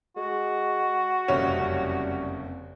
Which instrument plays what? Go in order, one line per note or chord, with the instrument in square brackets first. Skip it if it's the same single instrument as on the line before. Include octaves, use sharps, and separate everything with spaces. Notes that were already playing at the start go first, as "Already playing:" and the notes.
[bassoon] G#3 [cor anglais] F#4
[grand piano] F#1 F2 C3 [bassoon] G3 [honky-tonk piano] C#4